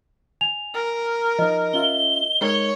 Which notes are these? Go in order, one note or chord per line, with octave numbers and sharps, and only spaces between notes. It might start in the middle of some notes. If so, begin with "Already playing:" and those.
G#5 F7
A#4
F3 D#4 D#5
C#4 F4 E5 G7
G#3 D#4 A#4 C#5